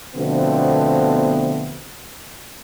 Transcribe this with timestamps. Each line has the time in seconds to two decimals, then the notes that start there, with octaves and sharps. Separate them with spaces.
0.15 B2 D3 F3 A3 B3 C4